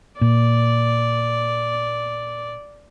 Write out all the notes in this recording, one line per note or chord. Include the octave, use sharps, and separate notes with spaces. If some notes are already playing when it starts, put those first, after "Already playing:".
A#2 D5